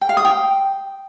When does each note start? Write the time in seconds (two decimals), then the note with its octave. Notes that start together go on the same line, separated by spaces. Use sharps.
0.01 G5
0.09 F5
0.17 D#6
0.25 G5